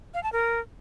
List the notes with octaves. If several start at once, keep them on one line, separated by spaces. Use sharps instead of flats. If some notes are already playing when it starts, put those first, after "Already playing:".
F5
A5
A#4